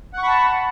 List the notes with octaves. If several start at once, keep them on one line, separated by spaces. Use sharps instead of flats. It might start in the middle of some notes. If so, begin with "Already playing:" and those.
F#5 A5 B5 C#6